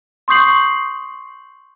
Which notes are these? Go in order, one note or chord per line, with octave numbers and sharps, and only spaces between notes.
C6 C#6 D#6 G6 C7 F#7